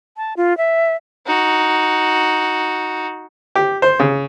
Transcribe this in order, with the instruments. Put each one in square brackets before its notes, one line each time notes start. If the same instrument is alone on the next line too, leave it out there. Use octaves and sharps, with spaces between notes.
[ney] A5
F4
E5
[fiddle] D#4 F#4
[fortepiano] G4
C5
C#3